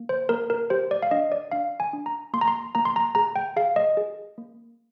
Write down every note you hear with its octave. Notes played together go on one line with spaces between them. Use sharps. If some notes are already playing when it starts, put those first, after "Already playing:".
Already playing: A#3
C5
A#3 A#4
A#4
G4 C5
D5
F5
D4 D#5
D5
D4 F5
G#5
D4
A#5
A#3 C6
A#5
C6
A#3 A#5
C6
A#5
G#4 A#5
G5
G#4 F5
D#5
G#4
A#3